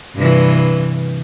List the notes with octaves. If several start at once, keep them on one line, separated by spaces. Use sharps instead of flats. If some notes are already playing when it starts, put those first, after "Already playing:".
G2 C3 E3